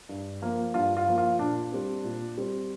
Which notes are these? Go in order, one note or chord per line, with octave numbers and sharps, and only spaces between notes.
G2
F3 A#3
G2 F4
F4
F3 A#3
F4
A#2 D4
G3 C4
A#2
G3 C4